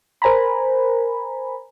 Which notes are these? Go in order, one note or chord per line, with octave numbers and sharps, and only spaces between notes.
A#4 C5 G#5 A#5 B5